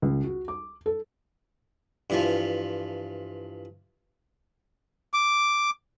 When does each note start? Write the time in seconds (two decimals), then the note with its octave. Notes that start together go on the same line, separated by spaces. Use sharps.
0.02 C#2
0.24 F#4
0.48 D6
0.86 A4
2.10 G2 E3 F3
5.14 D6